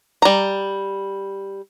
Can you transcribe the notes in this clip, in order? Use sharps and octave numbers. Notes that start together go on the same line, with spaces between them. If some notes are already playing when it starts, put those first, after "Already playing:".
G3 A#5